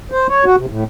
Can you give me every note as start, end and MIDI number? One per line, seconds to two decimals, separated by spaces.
0.12 0.27 72
0.29 0.45 73
0.45 0.56 66
0.57 0.66 48
0.69 0.84 45